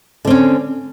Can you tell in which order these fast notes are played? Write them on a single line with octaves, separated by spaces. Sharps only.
D3 C4 C#4